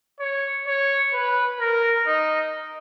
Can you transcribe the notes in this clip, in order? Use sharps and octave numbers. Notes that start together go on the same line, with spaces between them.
C#5
C#5
B4
A#4
D#4